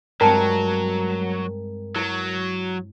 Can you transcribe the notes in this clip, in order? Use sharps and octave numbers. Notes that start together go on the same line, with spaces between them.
G2 F#3 G#3 C4 A#4 G5 A5
F#3 E4 B4